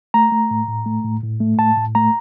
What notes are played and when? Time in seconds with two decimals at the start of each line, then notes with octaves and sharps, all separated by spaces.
0.14 A3 A#5
0.32 A3
0.51 A2
0.68 A2
0.86 A3
1.05 A2
1.23 A2
1.40 A3
1.58 A2 A5
1.77 A2
1.95 A3 A#5